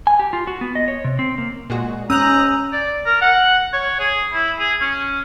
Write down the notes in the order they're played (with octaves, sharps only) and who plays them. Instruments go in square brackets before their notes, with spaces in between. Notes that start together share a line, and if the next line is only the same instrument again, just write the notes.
[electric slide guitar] G#5
G4
F4
F#4
B3
D#5
C#5
C3
C4
A#3
[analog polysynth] A#2 G#3 F#4
[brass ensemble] G#2 A#5 [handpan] C#4 [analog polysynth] D#6 F#6 [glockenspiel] E6 G6 F7
[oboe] D5
A#4
F#5
C#5
G#4
E4
G#4
C#4